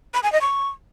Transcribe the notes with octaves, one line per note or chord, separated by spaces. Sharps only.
B5
G#5
D#5
C#6